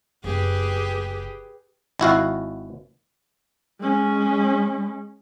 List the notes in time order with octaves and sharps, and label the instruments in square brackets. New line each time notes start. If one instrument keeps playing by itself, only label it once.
[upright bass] F#1 [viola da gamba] G4 G#4 B4
[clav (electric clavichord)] G#1 E4 F#4 F5
[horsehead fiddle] G#3 C#4